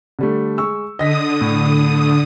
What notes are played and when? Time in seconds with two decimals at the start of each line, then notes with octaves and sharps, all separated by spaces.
0.19 D3 G3 A3
0.58 G#3 C#6 E6
0.99 D3 D#5 D#6 A#6 B6
1.41 A2